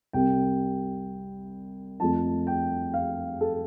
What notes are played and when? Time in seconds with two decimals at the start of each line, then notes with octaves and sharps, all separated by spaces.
0.13 C2 C3 G3 G5
2.00 F2 F3 A3 A5
2.47 G5
2.94 F5
3.41 A4